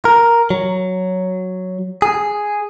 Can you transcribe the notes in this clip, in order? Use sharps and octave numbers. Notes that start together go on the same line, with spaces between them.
A#4
F#3
G#4